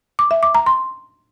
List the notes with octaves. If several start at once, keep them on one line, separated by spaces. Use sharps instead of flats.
D6
E5
D6
A#5
C6